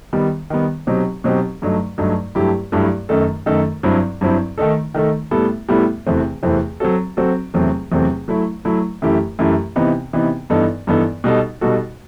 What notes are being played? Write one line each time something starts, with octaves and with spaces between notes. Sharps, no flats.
D#3 G3 B3
D#3 G3 B3
B2 F#3 C4 D#4 G4
B2 F#3 C4 D#4 G4
G2 F#3 A3 D#4
G2 F#3 A3 D#4
G2 F#3 A3 E4 G4
G2 F#3 A3 E4 G4
F#2 D#3 A3 D#4 A4
F#2 D#3 A3 D#4 A4
G2 F#3 C4 E4
G2 F#3 C4 E4
D#3 A3 D#4 A4
D#3 A3 D#4 A4
A2 G3 B3 E4 A4
A2 G3 B3 E4 A4
E2 C3 E3 A3 C4
E2 C3 E3 A3 C4
F#3 C4 F#4 A4
F#3 C4 F#4 A4
E2 C3 F#3 A3 C4
E2 C3 F#3 A3 C4
F#3 A3 E4
F#3 A3 E4
F#2 E3 A3 E4 G4
F#2 E3 A3 E4 G4
C3 E3 B3 D#4
C3 E3 B3 D#4
G2 E3 B3 D#4 A4
G2 E3 B3 D#4 A4
B2 G3 D#4 F#4 A4
B2 G3 D#4 F#4 A4